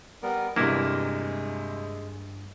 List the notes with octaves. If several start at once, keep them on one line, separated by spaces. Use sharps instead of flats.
G3 B3 A#4
G1 G2 C3 E3 G#3 A#3 E4